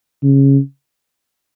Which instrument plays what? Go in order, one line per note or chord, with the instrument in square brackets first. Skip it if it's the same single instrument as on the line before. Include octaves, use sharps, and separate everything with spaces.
[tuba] C#3